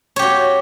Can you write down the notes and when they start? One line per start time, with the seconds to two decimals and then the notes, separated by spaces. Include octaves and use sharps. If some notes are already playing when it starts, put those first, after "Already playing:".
0.16 C#5
0.19 G4
0.22 F#4